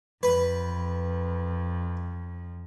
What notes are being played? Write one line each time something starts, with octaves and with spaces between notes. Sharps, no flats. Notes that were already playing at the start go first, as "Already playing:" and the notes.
F2 B4